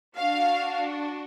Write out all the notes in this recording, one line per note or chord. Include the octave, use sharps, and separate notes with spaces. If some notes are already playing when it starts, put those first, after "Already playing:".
D4 F#4 F5